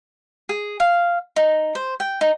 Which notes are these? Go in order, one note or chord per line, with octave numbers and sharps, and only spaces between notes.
G#4
F5
D#4
C5
G5
D#4